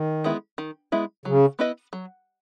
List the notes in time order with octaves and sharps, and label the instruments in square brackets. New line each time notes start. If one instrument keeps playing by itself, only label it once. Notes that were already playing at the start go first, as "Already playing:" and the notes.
Already playing: [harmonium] D#3
[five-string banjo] G#3 B3 E4
D#3
G#3 B3 E4
[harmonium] C#3 [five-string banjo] F#3
[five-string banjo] B3 E4 B4 D#5
F#3